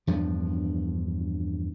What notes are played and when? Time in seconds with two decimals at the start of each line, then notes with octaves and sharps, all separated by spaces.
0.07 E2 G2 F3 D4